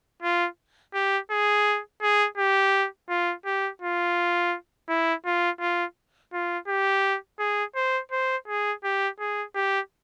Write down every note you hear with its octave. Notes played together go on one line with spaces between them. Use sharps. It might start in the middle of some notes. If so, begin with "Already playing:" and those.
F4
G4
G#4
G#4
G4
F4
G4
F4
E4
F4
F4
F4
G4
G#4
C5
C5
G#4
G4
G#4
G4